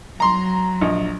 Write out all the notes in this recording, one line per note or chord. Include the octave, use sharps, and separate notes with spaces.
F#3 A#5 C6
A#1 D#5